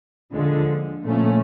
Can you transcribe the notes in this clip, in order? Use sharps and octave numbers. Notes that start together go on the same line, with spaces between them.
D#2 D3 F3 G#3
A#2 F3 A3 C#4